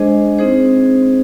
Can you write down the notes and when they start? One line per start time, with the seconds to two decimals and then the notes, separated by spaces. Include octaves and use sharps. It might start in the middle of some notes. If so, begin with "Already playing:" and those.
Already playing: G#3 D4 G#4 C5 D#5
0.38 C4 D#4 G#4 C5